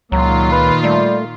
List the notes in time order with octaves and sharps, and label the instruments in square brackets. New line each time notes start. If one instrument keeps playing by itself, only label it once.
[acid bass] C#2 [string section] A#2 D#3 F4 [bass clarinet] F#3
[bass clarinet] B4
[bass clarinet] G3 [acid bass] A3